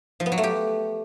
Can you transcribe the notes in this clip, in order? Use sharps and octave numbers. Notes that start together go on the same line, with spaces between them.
F3
B3
F#3
A3
G4